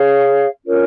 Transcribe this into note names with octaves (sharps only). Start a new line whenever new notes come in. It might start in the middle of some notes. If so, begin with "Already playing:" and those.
Already playing: G#4 C#5 F5
C#4 F4 A#4 C#5